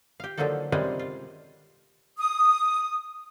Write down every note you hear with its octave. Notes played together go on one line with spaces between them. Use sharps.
G4 F5
D3 D#3 F3 F#3 A#3 A4
C3 D#3 F3 G3 G#3 C#4
F4
D#6